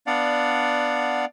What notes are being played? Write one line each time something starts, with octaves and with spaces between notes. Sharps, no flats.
B3 D4 D5 F5 F#5